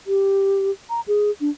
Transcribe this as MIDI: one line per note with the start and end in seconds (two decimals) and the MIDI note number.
0.07 0.71 67
0.89 1.01 82
1.08 1.31 68
1.40 1.50 62